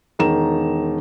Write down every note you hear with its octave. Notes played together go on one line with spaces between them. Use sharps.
E1 D#3 A#5 E7